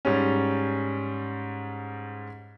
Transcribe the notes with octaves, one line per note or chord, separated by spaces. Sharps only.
G#2 G3 C#4